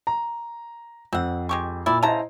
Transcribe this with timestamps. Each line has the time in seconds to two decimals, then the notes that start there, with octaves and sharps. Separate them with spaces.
0.07 A#5
1.13 F2 C4 F#5
1.49 G#3 G4 C#6
1.86 A#2 E4 D5
2.03 C#3 E4 C5 D#5 A5 A#5